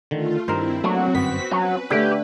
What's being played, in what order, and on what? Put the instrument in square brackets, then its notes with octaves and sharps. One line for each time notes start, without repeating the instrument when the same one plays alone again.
[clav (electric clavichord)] D3 D#3 [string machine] A3 F4
[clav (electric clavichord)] G2 D#3 [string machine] C4 E4 [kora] A#4 C5
[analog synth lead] F#3 [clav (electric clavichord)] A3 A#3 D4 [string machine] C4 F#4
[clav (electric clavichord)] G1 F#2 [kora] B3 [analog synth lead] B6
[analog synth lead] F#3 [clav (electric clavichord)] C#4 [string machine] B4
[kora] D3 A3 [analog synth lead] G4